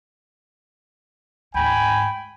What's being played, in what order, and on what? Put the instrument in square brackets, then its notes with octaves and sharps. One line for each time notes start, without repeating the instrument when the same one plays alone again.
[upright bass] D2 G#2 [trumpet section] G5 G#5 B5